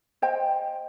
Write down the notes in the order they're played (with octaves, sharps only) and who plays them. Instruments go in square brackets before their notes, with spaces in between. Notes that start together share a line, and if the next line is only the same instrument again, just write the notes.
[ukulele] C5 D#5 G5